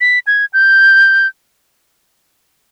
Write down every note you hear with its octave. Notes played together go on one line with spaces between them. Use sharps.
B6
G#6
G6